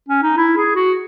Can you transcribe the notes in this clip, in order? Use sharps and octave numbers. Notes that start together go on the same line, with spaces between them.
C#4
D#4
E4
G#4
F#4